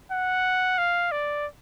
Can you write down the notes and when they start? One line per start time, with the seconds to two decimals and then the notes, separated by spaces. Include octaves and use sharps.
0.12 F#5
0.78 F5
1.11 D5